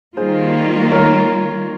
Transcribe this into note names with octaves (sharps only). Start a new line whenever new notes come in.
D#3 G3 A#3 F4 G#4 C5
A#4 C#5